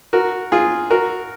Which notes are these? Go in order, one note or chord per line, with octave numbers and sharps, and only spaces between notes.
F#4 A#4
F4 G#4
F#4 A#4